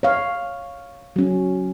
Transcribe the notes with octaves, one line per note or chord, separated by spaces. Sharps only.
C#5 F5
F#3 C#4